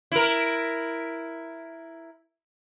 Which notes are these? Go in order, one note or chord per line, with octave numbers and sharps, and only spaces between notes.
E4 A#4